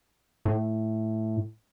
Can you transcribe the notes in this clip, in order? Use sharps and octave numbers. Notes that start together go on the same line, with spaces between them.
A2